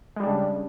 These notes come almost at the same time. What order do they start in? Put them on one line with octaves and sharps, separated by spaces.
G#3 G3 D4 C#3